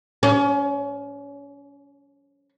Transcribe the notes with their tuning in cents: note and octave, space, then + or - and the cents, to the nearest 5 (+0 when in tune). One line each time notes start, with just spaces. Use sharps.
C#4 +30